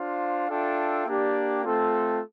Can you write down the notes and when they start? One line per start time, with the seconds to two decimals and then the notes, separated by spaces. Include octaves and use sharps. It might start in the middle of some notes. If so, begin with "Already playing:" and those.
Already playing: D4 F4 C5 F5
0.49 D4 F4 A4 E5 G5
1.06 A#3 D4 G4 D5
1.64 A3 C4 F4 A4